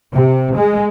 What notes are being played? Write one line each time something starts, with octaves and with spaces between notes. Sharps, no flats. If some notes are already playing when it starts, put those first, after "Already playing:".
C3
G#3